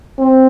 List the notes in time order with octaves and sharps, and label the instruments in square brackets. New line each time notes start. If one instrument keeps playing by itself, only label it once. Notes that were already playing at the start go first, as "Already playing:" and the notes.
[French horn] C4